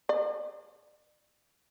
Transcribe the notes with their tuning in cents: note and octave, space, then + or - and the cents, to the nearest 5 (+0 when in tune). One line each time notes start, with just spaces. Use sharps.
D5 +45